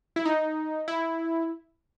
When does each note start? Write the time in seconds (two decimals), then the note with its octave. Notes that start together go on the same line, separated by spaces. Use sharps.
0.16 E4
0.25 D#4
0.88 E4